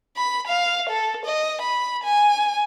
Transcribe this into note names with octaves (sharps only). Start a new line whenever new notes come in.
B5
F5
A4
D#5
B5
G#5